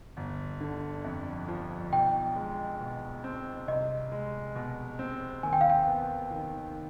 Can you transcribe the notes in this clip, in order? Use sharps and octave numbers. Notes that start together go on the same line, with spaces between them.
G1
D3
F2
F3
B1 G5
G#3
B2
C4
C2 D#5
G#3
B2
C4
D#2 G#5
G5
F5
G5
B3
D#3